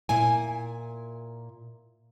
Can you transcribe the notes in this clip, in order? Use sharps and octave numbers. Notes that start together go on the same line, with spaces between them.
A#2 E4 G#5